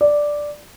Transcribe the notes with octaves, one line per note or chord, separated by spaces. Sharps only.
D5